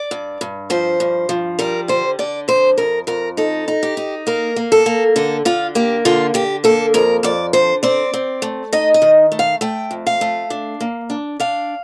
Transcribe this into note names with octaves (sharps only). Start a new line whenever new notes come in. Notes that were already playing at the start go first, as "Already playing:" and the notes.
Already playing: D5
G2
G2
F3 C5
G2
F3
G3 A#4
D3 C5
D3 D5
F2 C5
F2 A#4
F2 A#4
D#4 A4
D#4
G4
D#4
A#3 A#4
A#3
A4
A#3
D3 A4
D3 F4
A#3 G4
D3 F4
D3 G4
A#3 A4
F2 A#4
F2 D5
D3 C5
C4 D5
C4
A3
D#4 D#5
D#5
D#3
A3
F5
A3 G5
F2
F5
A3
D4
A#3
D4
D4 F5